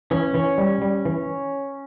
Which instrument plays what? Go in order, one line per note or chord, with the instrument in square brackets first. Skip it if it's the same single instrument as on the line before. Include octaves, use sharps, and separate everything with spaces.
[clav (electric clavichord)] E3 [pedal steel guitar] C#4
[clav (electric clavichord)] E3
G3
G3
E3